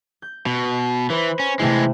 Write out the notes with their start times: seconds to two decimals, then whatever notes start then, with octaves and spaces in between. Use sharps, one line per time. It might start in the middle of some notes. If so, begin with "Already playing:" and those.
0.22 G6
0.46 B2
1.10 E3 B4 C5
1.40 C#4
1.59 C3 E3 G#3 A3 E4